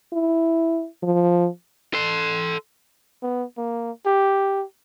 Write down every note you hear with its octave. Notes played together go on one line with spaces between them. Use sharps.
E4
F3
A4 C6
B3
A#3
G4